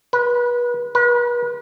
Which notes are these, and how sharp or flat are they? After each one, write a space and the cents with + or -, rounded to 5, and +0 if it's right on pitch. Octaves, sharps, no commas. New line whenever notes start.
B4 -30
B4 -40